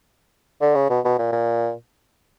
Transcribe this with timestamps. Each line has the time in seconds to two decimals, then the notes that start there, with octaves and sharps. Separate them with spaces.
0.61 D3
0.75 C#3
0.90 B2
1.05 B2
1.18 A#2
1.32 A#2